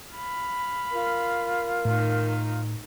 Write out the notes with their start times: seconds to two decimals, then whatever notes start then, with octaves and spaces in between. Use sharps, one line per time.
0.14 F5 B5
0.93 F4 A#4
1.85 A2 D#3 D#4